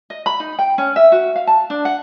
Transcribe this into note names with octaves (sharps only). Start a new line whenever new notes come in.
D#5
B5
D#4
G5
C#4
E5
F#4
F5
A5
D4
F#5